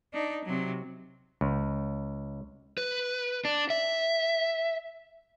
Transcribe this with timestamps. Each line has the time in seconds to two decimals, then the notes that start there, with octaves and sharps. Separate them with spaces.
0.13 D4 D#4
0.45 C3 F#3
1.41 C#2
2.78 B4
3.45 D4
3.70 E5